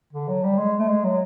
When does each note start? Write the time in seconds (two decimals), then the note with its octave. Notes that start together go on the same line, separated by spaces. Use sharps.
0.13 D3
0.28 F#3
0.44 G3
0.58 G#3
0.79 A3
0.88 G#3
1.04 F#3